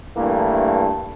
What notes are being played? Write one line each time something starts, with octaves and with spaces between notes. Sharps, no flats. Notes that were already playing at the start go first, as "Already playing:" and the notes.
G2 E3 A3 A#3